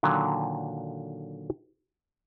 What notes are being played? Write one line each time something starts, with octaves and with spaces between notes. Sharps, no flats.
A#2 D3 D#3 F#3